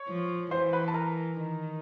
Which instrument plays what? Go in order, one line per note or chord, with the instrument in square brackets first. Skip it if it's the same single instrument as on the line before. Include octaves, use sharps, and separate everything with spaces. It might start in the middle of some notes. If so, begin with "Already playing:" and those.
Already playing: [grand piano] C#5 C#6
[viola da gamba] F3
[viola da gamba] E3 [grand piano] C5 C6
[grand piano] B4 B5
A5
A#4 A#5
[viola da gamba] D#3